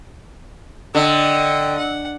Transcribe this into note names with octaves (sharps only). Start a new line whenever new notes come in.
D3 D#5 G5 E6
F#5